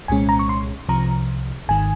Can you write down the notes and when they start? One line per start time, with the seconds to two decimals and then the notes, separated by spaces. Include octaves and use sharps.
0.08 C2 A#2 G#3 C#4 G#5
0.29 A#5
0.39 C#6
0.49 C6
0.89 C2 C3 F3 A#5
1.69 G#1 G#2 D#3 G#5